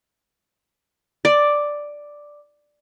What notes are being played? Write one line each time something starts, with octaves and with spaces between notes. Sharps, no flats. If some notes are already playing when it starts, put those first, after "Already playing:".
D5